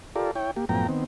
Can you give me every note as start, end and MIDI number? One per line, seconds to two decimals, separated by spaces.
0.16 0.31 65
0.16 0.31 67
0.16 0.31 69
0.16 0.31 70
0.16 0.31 74
0.36 0.51 64
0.36 0.51 73
0.36 0.51 79
0.57 0.65 58
0.57 0.65 67
0.69 0.87 42
0.69 0.87 45
0.69 0.87 53
0.69 0.87 59
0.69 0.87 79
0.69 0.87 82
0.89 1.04 51
0.89 1.04 59
0.89 1.04 60